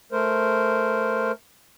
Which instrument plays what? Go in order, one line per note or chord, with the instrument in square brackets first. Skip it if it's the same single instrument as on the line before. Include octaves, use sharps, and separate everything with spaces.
[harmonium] A3 A#4 C5